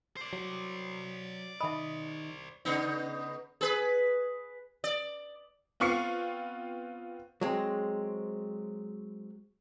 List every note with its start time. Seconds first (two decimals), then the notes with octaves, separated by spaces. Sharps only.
0.17 C5 D5
0.33 F#3
1.61 D#3 D#5 E5 A5 B5
2.65 C#3 B3 D#4
3.61 G#4 B4
4.84 D5
5.80 B3 C4 F4 C#6 C7 C#7
7.41 F#3 G#3 C4